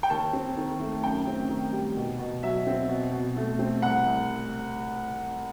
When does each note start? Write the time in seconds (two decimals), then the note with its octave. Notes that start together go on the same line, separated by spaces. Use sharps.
0.03 G5
0.10 D#2 A5
0.33 C4
0.57 D#3
0.80 A3
1.03 F#2 G5
1.27 C4
1.49 D#3
1.72 G3
1.96 B2
2.19 B2
2.43 F#3 E5
2.67 C4
2.89 B2
3.12 B2
3.37 A3
3.59 C4
3.82 C2 F#5
4.06 C2